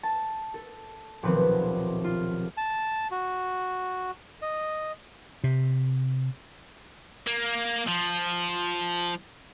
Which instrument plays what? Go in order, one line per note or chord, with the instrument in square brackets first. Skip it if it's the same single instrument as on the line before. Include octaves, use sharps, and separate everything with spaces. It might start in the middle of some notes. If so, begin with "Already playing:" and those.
[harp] A5
A4
D#1 B1 F3 C4 B4
F4
[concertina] A5
F#4
D#5
[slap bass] C3
[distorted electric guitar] A#3
F3